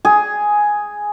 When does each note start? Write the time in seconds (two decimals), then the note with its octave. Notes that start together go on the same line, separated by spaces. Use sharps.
0.05 G#4